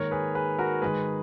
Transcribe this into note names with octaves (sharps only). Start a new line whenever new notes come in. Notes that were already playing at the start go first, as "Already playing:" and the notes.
Already playing: G#2 D#3 A#3 A#4 C#5
G#4 B4
G#4 B4
F#4 A#4
G#2 D#3 G#3 G#4 B4